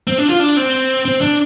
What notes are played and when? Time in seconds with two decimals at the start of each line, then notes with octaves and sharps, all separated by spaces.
0.07 C4
0.18 D4
0.30 F4
0.40 D4
0.57 C4
1.05 C4
1.21 D4